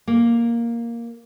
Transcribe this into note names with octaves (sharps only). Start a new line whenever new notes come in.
A#3